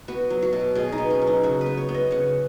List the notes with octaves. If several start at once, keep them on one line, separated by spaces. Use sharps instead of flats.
B3 F#4
F#3
F#4
B2
B2 G#4
D#4
B3
C#4
F#3
D#4
C#3 F#4
B4
B3
C#5
B3
D#5
C#3 F#5